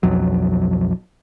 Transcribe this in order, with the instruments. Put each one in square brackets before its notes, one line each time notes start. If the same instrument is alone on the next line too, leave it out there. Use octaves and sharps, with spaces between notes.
[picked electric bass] B1 F2 F#3